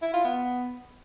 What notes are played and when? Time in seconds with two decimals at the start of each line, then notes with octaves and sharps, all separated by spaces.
0.02 E4
0.13 F4
0.25 B3